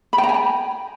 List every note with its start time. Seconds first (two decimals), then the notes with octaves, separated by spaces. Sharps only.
0.13 B5
0.18 G5
0.24 A#5
0.29 G#5
0.34 G5